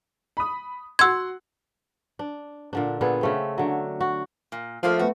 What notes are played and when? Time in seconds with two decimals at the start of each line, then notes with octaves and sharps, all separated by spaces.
0.37 B5 D#6
0.99 F#4 F#5 C6 E6 G#6
2.19 D4
2.73 A#2 D3 D4
3.01 A#2 B3 G#4 A4
3.21 C#3 A3 C4
3.58 D3 F#3
4.01 F#4
4.52 A#2
4.83 F3 A3 A#3 F4
4.99 A3 B3 F#4 B4